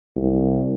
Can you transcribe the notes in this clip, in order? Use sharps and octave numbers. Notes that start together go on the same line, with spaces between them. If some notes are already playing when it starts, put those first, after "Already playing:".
C2